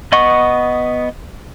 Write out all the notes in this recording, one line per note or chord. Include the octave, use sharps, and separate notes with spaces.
B3 D#5 F#5 C#6